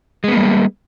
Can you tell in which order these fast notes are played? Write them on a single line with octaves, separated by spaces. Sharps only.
G#3 B3 A#3 G3